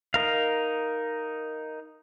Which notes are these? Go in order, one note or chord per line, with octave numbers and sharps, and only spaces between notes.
D#4 A#4 F5